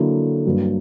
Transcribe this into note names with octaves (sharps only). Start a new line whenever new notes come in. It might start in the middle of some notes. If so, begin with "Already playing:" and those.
Already playing: D3 F#3 A#3 E4
G2 F#3 A#3